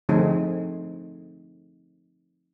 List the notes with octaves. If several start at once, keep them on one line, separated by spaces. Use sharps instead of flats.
D3 F3 A3 C4 D#4 G#4